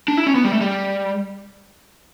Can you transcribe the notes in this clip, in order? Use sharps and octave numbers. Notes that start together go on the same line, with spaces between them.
D4
E4
C#4
B3
G3
A3
G3